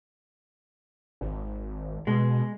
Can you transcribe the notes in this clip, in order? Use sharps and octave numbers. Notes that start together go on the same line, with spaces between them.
G#1
B2 G#3